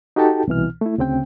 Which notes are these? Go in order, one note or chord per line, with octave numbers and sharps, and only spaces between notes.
D#4 F#4 G4 A4 G5 A5
C2 B2 E3 F6
A3 E4
D2 C#3 C4 G5